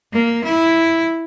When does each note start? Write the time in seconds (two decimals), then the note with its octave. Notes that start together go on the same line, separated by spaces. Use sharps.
0.13 A#3
0.44 E4